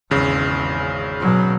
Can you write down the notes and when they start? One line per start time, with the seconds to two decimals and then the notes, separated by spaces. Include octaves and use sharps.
0.11 G#1 E2 C#3
1.20 B2 F#3